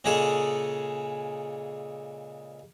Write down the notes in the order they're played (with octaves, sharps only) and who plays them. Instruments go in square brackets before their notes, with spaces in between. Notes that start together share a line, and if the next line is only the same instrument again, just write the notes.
[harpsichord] A#2 C#3 G#3 G#4 A4